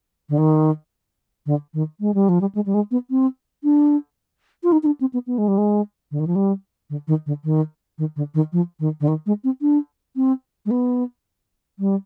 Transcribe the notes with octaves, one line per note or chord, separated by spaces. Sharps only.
D3
D#3
D3
D#3
G#3
G3
F3
G3
G#3
G3
G#3
B3
C4
D4
F4
D#4
D#4
D4
C4
B3
B3
G#3
G3
G#3
D3
D#3
F3
G3
D3
D#3
D3
D#3
D#3
D3
D#3
F3
D#3
D3
D#3
G#3
C4
D4
C4
G#3
B3
G3